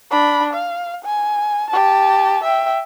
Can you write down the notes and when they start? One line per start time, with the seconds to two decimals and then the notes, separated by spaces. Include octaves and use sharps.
0.11 D4 B5
0.53 F5
1.05 G#5
1.70 G4 A5
2.43 E5 G5